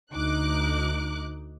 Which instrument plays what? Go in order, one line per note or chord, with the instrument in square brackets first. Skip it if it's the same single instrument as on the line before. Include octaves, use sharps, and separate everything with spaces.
[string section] D2 D#4 D6 F#6